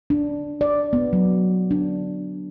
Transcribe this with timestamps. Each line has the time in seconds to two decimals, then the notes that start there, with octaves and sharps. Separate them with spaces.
0.10 D4
0.61 D5
0.93 B3
1.13 F#3
1.71 D4